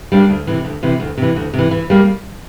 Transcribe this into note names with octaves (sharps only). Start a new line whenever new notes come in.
G3 A#3 D4
D2
C3 E3
D2
C3 E3
D2
C3 E3
D2
C3 E3
E3
G3 A#3